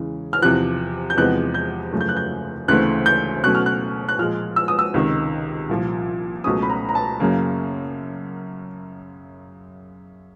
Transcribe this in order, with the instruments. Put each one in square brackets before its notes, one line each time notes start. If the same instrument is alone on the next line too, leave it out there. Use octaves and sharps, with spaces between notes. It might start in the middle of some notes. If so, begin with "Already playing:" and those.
Already playing: [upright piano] E2 C#3 E3 G#3 C#4
F6
E2 C3 F3 F#6
G6
E2 C3 F3 G#3 B3 F#6
G6
F#2 C#3 F3 A3
G6
F#6
G6
D2 C#3 E3 A3 C4 F#6
G6
B2 F#3 A3 C#4 F#6
F6
F#6
F#6
A#2 F3 G#3 F6
E6
D#6
E6
C#2 C3 D#3
C2 A#2 F3
C#2 B2 F#3 A3 C#4 D#6
B5
A#5
A#5
A5
F#2 C#3 F#3 A#3